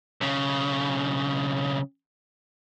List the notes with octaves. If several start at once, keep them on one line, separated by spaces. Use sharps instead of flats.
B1 C#3